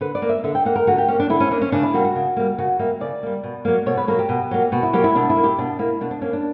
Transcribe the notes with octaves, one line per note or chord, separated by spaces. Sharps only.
D3 B4
D5
A#3
E5
D3 E5
G5
A#3 F#5
A#4
D3 F#4
G4
A#3 C#4
D4
D3 E4
C#4
A#3 D4
C#4
C#3 D4
E4
G3 A#3 F#4
F#4
C#3
G3 A#3
C#3 F#4
G3 A#3 E5
C#3 D5
G3 A#3
B2
F#3 A#3
B2 C#5
B4
F#3 A#3 A#4
G4
B2
F#3 A#3
B2 F#4
E4
F#3 A#3 G4
E4
B2 D4
E4
A#3
G4
B2 D4
A#3 E4
B2 D4
D4
A#3 C#4
D4